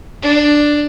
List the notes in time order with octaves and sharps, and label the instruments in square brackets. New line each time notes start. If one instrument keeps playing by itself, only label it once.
[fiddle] D4